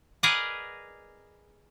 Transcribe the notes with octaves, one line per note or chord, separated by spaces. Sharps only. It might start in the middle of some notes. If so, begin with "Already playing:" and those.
G#4 A#4 B4 D5 D#5 F#5